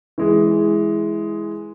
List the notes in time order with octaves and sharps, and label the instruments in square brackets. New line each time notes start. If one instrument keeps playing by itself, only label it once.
[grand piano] E3 G#3 G#4